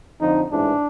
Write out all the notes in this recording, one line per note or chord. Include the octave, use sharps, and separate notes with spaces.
F2 D3 F3 D#4
A1 G#2 E3 D4